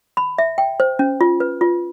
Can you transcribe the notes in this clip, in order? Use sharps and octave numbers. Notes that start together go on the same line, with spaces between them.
B5
E5
G5
C5
C#4
F4
B4
F4